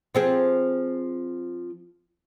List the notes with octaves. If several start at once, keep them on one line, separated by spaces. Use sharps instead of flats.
F3 C4 G#4